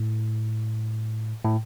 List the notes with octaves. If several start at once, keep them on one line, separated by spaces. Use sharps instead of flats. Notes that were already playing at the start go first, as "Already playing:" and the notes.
Already playing: A2
A2